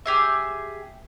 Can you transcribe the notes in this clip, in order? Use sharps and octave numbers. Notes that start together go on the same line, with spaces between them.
G4 G#4 E5